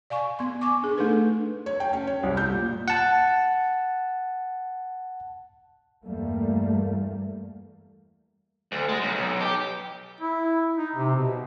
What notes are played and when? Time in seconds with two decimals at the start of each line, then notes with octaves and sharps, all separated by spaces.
0.10 D5 F5 G#5 C#6
0.39 B3 C6
0.61 G#5 C#6 D6
0.82 D4 G#4
0.98 A3 D4 D#4 A4 B4
1.66 C#5
1.80 G5
1.93 C#4
2.07 C#5
2.23 C2
2.37 G6
2.51 A#2
2.88 F#5 A5
6.04 E2 G2 G3 A3 A#3
8.72 D2
8.89 G#3
9.02 B1
9.16 B1
9.41 G4
10.21 E4
10.78 D#4
10.95 C3
11.16 B2